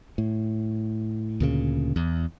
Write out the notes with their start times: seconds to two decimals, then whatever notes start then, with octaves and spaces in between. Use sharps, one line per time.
0.18 A2
1.41 D2 A#2 C#3
1.96 E2